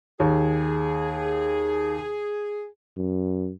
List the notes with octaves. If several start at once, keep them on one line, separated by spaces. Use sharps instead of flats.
D#2 G#4
F#2